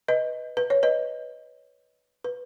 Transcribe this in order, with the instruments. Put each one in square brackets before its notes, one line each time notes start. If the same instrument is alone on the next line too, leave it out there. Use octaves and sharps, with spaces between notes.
[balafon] B4 D#5
B4
C#5
B4 D#5
B4